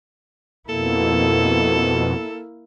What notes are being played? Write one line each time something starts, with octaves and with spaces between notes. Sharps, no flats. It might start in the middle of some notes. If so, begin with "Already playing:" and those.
F2 B2 A#3 E4 A4